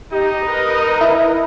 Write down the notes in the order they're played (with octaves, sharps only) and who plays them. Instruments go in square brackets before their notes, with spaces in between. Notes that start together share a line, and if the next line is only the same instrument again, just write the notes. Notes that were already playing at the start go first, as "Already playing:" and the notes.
[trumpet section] D#4 [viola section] G4 D#5
[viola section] A#4 B4 D#5
[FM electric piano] E4